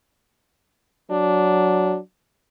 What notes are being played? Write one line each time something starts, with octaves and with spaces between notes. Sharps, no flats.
F#3 D4